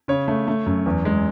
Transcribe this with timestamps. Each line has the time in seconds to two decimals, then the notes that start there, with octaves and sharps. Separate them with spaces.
0.08 C#3 C#5
0.28 A3
0.48 A3
0.66 F#2
0.86 E2
1.05 G#3